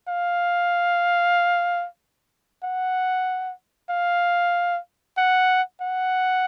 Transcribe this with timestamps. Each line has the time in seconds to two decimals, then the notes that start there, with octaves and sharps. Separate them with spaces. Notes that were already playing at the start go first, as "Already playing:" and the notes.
0.08 F5
2.64 F#5
3.90 F5
5.18 F#5
5.81 F#5